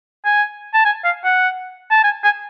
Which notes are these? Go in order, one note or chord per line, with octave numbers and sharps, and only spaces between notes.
G#5
A5
G#5
F5
F#5
A5
G#5
G#5